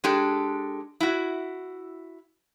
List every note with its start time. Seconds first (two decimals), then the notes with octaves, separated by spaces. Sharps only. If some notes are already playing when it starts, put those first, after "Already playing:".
0.04 G#3 D4 G4 A4
1.00 E4 F#4